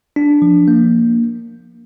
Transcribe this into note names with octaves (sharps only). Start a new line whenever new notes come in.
D4
F3
A#3